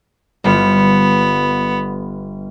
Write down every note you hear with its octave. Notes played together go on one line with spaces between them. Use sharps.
G1 G3 B3 F4